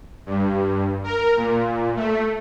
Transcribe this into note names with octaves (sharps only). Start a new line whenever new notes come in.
G2
A#4
A#2
A3